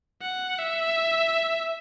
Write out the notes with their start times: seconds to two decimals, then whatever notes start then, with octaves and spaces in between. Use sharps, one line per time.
0.22 F#5
0.59 E5